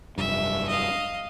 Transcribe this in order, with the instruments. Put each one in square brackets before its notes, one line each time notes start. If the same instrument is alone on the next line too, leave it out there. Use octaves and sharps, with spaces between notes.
[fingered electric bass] F1 G2 [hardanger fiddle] E5
[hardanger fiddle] D#5 F5